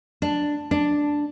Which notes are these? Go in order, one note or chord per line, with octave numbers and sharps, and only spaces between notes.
D4
D4